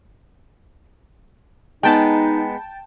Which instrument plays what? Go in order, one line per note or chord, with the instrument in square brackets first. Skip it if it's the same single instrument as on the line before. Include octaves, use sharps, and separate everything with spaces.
[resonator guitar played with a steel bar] G#3 B3 [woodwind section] D#4 [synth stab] G5 A5